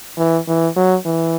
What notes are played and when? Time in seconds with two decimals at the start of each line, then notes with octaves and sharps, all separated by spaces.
0.18 E3
0.48 E3
0.76 F#3
1.05 E3